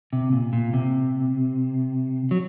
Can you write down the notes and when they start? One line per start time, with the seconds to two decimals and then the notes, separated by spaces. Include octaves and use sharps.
0.13 C3
0.33 A#2
0.53 A#2
0.74 C3
2.31 F#3